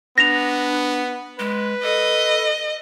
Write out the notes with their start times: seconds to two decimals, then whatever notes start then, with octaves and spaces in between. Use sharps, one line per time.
0.18 B3 D4 A#6 F7
1.39 G#3 B4
1.83 A4 D#5